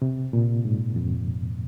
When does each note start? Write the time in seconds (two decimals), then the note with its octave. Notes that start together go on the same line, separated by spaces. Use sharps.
0.02 C3
0.33 A#2
0.65 G#2
0.96 F2